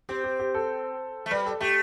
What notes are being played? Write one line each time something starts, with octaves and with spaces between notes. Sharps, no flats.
C4 G4
G4
G4
A4
A3
G3 B4
A4
A3 G4